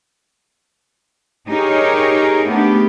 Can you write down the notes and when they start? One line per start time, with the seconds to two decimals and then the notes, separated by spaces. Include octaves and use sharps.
1.49 D#4 G4 G#4 A#4 C#5
2.47 A3 B3 D4 G4